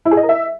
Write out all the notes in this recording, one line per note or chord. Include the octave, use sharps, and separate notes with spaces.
E4
G#4
D#5
A#4
E5